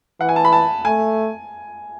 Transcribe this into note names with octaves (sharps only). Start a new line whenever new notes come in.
E3 F#5
G#5
A5
B5
A5
A3 G#5